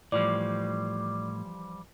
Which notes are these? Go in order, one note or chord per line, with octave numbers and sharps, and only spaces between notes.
A2 E3 F3 G3 D5 D6